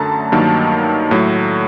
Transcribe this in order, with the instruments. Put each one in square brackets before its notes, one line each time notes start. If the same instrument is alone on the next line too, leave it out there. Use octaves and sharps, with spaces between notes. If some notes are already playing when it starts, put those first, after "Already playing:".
Already playing: [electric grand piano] F#2 D3 A3 A5 A#5
G2 D#3 F#3 A#3 A5
A2 F#3 A3